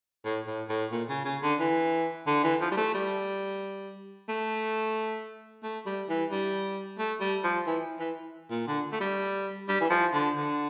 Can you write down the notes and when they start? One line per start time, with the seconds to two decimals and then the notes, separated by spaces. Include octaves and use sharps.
0.25 A2
0.47 A2
0.69 A2
0.92 A#2
1.09 C#3
1.25 C#3
1.43 D3
1.59 E3
2.27 D3
2.43 E3
2.61 F3
2.72 G3
2.77 A3
2.94 G3
4.29 A3
5.63 A3
5.86 G3
6.09 E3
6.31 G3
6.99 A3
7.20 G3
7.44 F3
7.67 E3
7.99 E3
8.51 A#2
8.67 D3
8.92 A3
9.01 G3
9.68 G3
9.80 E3
9.90 F3
10.14 D3
10.36 D3